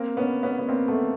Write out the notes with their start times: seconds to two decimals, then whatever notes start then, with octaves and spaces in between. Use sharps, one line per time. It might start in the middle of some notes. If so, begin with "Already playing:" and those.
Already playing: A#3 C4
0.17 B3 C#4
0.43 B3 C#4
0.59 B3
0.69 A#3 C4
0.88 A3 B3